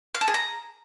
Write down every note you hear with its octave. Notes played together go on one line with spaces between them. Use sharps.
F5
A4
G#4
A#5